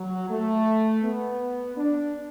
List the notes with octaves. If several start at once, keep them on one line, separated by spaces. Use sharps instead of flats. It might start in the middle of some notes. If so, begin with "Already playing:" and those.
Already playing: F#3
A3
B3
D4